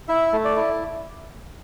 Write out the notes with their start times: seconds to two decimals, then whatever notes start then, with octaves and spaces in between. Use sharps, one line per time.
0.08 E4 E5
0.33 A3
0.45 D5
0.56 E4